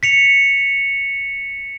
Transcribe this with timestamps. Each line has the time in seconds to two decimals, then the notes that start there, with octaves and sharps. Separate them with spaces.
0.03 B6 C#7 F7